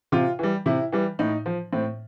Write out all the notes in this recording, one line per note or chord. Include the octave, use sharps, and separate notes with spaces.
C3 F4
E3 G3
C3 E4
E3 G3
A2 D#4
F3
A2 C4